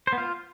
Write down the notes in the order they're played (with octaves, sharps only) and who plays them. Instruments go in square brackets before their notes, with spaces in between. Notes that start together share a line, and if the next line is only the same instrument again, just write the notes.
[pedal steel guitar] C5
B3
F4